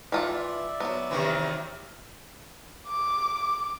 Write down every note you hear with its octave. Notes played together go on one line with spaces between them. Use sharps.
E3 F4 D5 E5 F#5
F#3 B3
C3 D#3 E3
D6